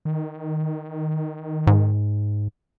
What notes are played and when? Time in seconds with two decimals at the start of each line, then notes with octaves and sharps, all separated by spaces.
0.05 D#3
1.67 G#2